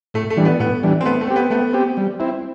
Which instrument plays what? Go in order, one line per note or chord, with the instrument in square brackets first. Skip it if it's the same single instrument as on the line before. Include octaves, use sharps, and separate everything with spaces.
[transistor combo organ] A2 [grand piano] A3
[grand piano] A3
[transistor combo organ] E3 G3 D4
[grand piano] B3
[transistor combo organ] A2 [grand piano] B3
[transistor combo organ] E3 G3 D4
[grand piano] C4
[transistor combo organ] A3 [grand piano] B3
[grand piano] A3
[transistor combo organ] C4 G4
[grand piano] B3
[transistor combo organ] A3 [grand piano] B3
[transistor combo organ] C4 G4
G3
C4 E4